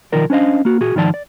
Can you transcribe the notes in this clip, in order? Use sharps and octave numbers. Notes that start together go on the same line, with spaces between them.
B1 D#3 F3 A#4 D5
C#4 D4 C5 D#5 F5
A#3 F#4
A#2 F#4 G#4
G#2 D#3 F3 D5 A5
D5